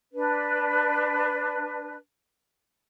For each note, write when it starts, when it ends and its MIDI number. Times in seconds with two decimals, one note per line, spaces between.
0.13 1.94 62
0.13 1.94 71